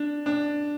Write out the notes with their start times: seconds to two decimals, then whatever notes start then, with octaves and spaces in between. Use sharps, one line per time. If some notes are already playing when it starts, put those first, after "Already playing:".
Already playing: D4
0.26 D4